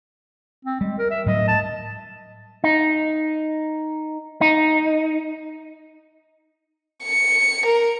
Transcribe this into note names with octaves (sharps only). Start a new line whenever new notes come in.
C4
G3 G#3
A#4
E5
A2 F#3 G3 D#5
A5
D#4
D#4
C#7
A#4